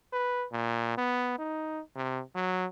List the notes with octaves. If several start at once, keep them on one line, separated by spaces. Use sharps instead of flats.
B4
A#2
B3
D#4
C3
F#3